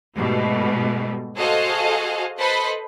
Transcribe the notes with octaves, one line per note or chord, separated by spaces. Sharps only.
G#2 B2 G3 A3
F#4 G#4 A4 C5 D#5 F5
A4 B4 C5 D#5 B5